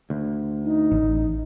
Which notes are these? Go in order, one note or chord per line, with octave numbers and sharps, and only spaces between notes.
D2
D#4
A1